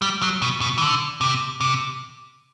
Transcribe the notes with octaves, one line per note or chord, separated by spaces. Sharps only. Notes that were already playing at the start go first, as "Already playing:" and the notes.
G3
F#3
B2
B2
E3
D3
C3
C3